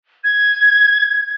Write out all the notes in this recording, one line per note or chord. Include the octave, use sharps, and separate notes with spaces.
G#6